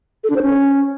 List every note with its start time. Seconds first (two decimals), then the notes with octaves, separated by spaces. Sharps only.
0.24 A4
0.30 D4
0.36 C5
0.42 C#4